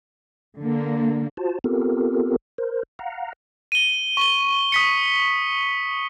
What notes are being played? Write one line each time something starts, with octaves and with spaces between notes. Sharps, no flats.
D3 A#3
F4 F#4 C5 A5
B3 C4 F4 G4 A4 A#4
A#4 C5
F5 F#5 A#5
D#7 G7
C#6 G7
D#6 B6 C#7